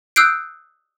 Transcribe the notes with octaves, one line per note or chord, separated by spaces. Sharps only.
D#6 E6 F#6 G6 C7 D7